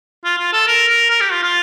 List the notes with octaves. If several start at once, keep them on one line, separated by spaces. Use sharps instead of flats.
F4
F4
A4
A#4
A#4
A#4
G4
F4
F4